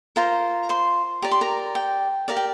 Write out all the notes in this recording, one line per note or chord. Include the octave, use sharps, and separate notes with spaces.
F4 A#4 C5 A#5
C5 C6
G4 D5 A#5
C6
A#4 A#5
G5
G4 A#4 D5 F5
G5